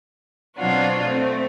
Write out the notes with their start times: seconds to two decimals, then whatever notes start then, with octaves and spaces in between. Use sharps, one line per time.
0.57 B2 F#3 C4 D4 F4 F#4
1.05 A3 C4